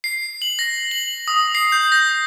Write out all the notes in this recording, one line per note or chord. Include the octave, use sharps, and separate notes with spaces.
C7
F#7
A#6
F#7
D#6
C7
G6
A#6